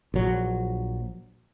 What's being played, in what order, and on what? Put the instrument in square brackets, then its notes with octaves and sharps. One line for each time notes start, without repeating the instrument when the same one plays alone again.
[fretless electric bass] A#1 F#3